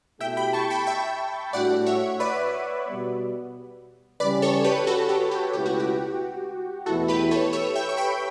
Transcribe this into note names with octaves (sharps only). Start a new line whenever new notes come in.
B2 A3 E4 G4 E5 G5
G5 B5
A5 C#6
G5 B5
E5 G5
A2 G3 D4 F#4 D5 F#5
C#5 E5
B4 D5
B2 G3 B3
C#3 E3 G3 C#4 B4 D5
A4 C#5
G4 B4
F#4 A4
G4
G4
C#2 B2 A3 E4 G4 B4
F#4
G4
E2 B2 A3 E4 F#4 A4
G4 B4
A4 C#5
C#5 E5
E5 G5
C#6
G5 B5